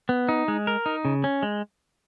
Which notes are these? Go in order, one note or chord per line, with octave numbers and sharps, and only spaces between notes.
B3
D#4
G#3
A#4
D#4
C#3
C#4
G#3